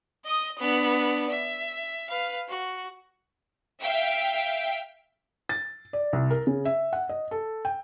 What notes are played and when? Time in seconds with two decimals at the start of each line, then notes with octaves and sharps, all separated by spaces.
0.25 D#5 D#6
0.59 B3 D4
1.30 E5
2.09 B4 F5
2.48 F#4
3.81 E5 F5 G5
5.49 A6
5.93 D5
6.13 C2
6.30 A#4
6.47 C#3
6.65 E5
6.93 F#5
7.09 D#5
7.31 A4
7.65 G5